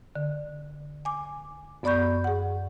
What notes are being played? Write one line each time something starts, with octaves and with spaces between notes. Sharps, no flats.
D3
G#5 D6
F#2 B3 D5 B5 C#6 G6
G#4 F#5